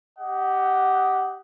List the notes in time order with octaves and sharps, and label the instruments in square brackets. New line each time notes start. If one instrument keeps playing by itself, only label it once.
[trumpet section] G4 D#5 F#5